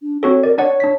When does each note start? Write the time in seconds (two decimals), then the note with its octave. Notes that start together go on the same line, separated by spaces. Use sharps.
0.02 D4
0.23 C4 F#4 A4 C#5
0.43 A#4 D5
0.58 D4 C#5 D5 F#5
0.80 D4 B6